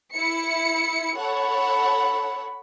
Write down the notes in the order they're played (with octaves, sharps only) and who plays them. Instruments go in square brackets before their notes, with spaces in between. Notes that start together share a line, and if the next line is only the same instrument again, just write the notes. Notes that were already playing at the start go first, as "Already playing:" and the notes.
[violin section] E4 C#7
[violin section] A4 C#5 F#5 [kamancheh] B5